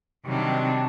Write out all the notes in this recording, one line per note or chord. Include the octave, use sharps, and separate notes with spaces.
C3 D#3 F#3 G3 D4